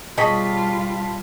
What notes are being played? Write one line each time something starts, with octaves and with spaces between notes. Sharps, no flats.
B2 G3 F4 G#4 C#5 D#5 A5 B6